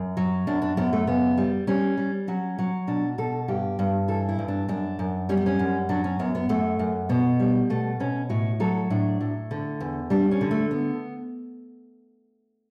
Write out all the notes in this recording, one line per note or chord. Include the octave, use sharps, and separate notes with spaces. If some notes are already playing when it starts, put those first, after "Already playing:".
Already playing: F#2
F#3
F#2 D4
D4
F#2 B3
A3
C#3 B3
G3
G3 C#4
G3
F#3 C#4
F#3
B2 D4
B2 A4
G2 G4
G2
E3 A4
E4
G2
D4
F#2 D4
F#2
G3 C#4
B3
C#4
F#2
F#3 D4
C#4
F#2 B3
B3
F#2 A3
F#2
B2 B3
G3
B2 A3
B2 C#4
A2 F#4
F#3 A4
A2 D4
A2
D3
E2
G3 D4
C#4
D3
A3
B3